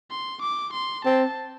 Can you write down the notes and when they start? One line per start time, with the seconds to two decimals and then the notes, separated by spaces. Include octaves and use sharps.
0.11 C6
0.42 D6
0.74 C6
1.05 C4 A5